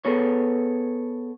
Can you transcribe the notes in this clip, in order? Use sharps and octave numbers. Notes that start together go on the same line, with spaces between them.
B3 G#4 A4 C#5